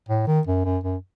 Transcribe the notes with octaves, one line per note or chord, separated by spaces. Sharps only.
A2
D#3
F#2
F#2
F#2